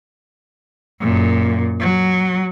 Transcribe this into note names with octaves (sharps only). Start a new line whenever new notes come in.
F#2 A#2
F#3